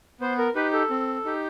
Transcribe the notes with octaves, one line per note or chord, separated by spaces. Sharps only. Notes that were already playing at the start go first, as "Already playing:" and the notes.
B3 C5
A#4
D#4 G4 B4
A4
C4
D#4 G4